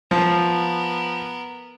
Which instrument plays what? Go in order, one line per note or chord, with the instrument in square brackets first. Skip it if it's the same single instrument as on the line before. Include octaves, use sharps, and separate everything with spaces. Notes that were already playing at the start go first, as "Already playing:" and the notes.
[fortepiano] F3 [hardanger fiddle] B3 A#4